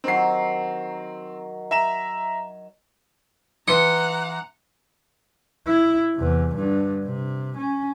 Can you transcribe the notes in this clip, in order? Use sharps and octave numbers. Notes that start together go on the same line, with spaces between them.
D#3 F#3 C4 C7
E5 A#5 E7
E3 F#5 A#5 C6 D#6 C#7
E4
E2 C3
G2 D3
C3
C#4